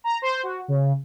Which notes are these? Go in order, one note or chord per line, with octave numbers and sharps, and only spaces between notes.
A#5
C5
F#4
C#3